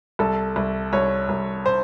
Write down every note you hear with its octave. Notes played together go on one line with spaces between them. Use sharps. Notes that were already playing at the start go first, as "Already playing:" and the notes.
C2 A4
C2
C2 C#5
C2
C5